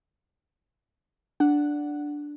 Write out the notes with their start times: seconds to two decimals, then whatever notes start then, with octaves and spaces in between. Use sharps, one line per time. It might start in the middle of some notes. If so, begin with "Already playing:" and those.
1.40 D4 F#5